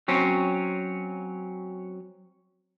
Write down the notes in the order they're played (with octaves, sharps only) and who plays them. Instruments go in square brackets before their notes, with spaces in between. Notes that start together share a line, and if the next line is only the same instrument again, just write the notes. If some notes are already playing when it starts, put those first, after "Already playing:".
[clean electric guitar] F#3 C4 C#4